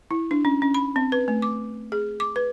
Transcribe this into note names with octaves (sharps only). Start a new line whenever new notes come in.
E4
D4
C#4
C#4
B5
C4
B4
A3
D6
G#4
D6
B4